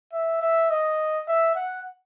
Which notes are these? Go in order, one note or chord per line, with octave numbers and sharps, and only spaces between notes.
E5
E5
D#5
E5
F#5